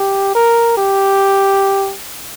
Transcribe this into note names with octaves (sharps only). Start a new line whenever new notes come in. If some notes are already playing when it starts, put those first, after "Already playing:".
Already playing: G4
A#4
G4